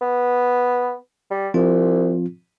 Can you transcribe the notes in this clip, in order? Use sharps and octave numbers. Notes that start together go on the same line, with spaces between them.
B3
G3
C2 F3 C4 F4